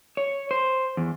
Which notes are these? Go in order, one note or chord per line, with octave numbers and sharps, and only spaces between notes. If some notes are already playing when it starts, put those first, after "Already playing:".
C#5
C5
E2